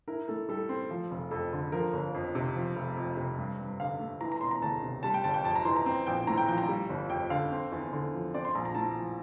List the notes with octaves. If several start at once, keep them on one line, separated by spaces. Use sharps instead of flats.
E4 A#4
A2 A4
G3 A4
C4
F3
F1
F2 A4
D3
F3 A#4
G1
F2
C3
F3
F1
F2
C3
G2
G2
D3 F5
A3
E3 A#5
A#5
E1 C6
A#5
D2 A5
C3
G3 A5
G5
G1 A5
G5
F2 A5
A#5
E3 C6
A#5
C4
A#1 G5
A2 A#5
G5
F3 G5
A#5
G3
G1
F2 G5
D3 F5
C4
E2
D3
F3
C4 D5
C6
A#1 A#5
A#5
A2 A5
F3